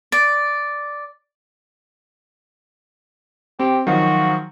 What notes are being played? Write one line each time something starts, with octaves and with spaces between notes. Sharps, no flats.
D5
C4 G4
D#3 F3 F#3 F#4